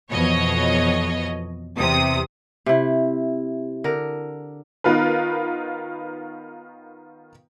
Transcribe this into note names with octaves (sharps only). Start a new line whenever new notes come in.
F2 B2 E3 C#5 D#5
E2 C3 D#6
C3 E4
D3 A#4
D#3 B3 F4 A#4 B4